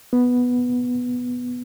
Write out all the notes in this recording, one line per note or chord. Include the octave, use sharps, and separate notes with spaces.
B3